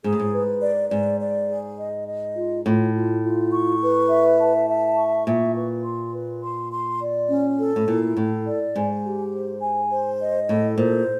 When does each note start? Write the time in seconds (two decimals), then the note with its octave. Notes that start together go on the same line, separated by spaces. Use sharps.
0.04 G#2 G#4
0.13 A2
0.19 G#2
0.33 B4
0.62 D5
0.91 G#2 D5
1.21 D5
1.49 G#4
1.78 D#5
2.07 D#5
2.36 F4
2.65 A2 F4
2.94 F4
3.24 F4
3.52 C#6
3.82 B4
4.10 E5
4.40 A5
4.69 E5
4.97 C#6
5.26 A#2 E5
5.55 B4
5.85 C6
6.14 B4
6.42 C6
6.72 C6
7.01 D5
7.29 C#4
7.58 A4
7.76 A2
7.87 A#2 E4
8.17 A2 A4
8.46 D5
8.75 G#2 G#5
9.04 G4
9.33 C5
9.61 G#5
9.91 C5
10.20 D#5
10.49 A2 A4
10.78 A#2 C5